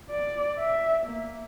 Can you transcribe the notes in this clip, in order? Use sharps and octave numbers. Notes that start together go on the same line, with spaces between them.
D5
E5
A#3